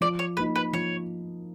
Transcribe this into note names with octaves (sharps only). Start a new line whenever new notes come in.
F3 D5
C#5
A#3 D#4 B4
B4
F3 C#5